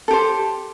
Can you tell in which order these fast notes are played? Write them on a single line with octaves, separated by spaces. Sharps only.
A4 G4 C5